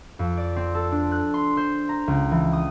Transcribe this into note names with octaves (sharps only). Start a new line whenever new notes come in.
F2
D5
C4
A4
D4
F#6
C6
C5
A#5
C#2
E3
D#6